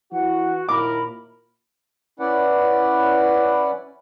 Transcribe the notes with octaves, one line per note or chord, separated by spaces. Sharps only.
E3 F#4 F#5
D#2 A#2 E4 A#4 B5 D6
C#4 E4 B4 D5 F#5